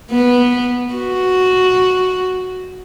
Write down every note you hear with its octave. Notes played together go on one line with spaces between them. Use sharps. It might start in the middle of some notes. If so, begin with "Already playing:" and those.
B3
F#4